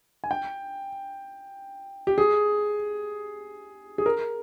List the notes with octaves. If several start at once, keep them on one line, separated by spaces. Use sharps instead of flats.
G#5
G5
G4
G#4
G#4
A#4